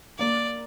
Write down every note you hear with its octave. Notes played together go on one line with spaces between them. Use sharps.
A#3 D5